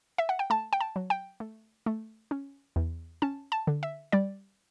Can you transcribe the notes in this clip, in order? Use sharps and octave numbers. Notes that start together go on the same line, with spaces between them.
E5
F#5
G5
A3 A5
G5
A5
F#3
G5
A3
A3
C#4
E2
C#4 A5
A5
D3
E5
G3 D5